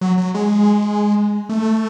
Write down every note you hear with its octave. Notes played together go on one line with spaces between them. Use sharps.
F#3
F#3
G#3
A3